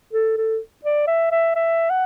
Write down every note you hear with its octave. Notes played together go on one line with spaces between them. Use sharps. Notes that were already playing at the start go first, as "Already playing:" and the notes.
A4
A4
D5
E5
E5
E5
F#5